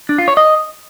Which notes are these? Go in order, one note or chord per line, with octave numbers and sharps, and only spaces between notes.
D4
F4
C#5
D#5